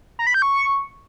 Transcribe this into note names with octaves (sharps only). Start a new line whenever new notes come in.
A#5
B5
G6
C#6